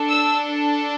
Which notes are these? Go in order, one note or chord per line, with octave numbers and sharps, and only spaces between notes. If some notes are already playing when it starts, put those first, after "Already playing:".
Already playing: D4 A4
E6